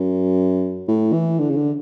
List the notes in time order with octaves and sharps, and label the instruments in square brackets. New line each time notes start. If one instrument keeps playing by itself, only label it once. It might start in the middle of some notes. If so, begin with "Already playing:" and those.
Already playing: [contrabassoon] F#2
A2
E3
D3
C#3
D3